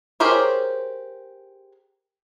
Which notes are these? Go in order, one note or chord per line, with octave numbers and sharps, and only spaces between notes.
G4 G#4 A#4 C5 C#5